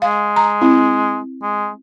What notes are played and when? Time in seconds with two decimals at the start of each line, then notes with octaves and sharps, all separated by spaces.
0.02 G#3 F5
0.36 A#5
0.61 C4 E4
1.43 G#3